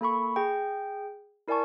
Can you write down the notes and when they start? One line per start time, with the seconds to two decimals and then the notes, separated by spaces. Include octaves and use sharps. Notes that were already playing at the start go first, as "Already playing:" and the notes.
0.01 A#3 A4 B5 C#6
0.36 G#4 G5
1.48 E4 A#4 D5 G#5 A5 C#6